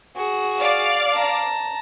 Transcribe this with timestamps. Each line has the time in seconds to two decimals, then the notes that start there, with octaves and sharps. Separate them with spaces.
0.16 F#4 G#4
0.59 D5 F5
1.12 A5 A#5